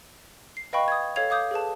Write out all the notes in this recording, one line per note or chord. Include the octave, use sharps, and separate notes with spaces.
C7
B4 D#5 F5 G5 B5 C#6
D#6 G#6
A4 C#5 F5 G#6 F7
F5 D6 D#6 G6
G#4 A4 B4 A5